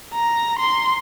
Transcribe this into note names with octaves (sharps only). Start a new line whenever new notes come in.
A#5
C6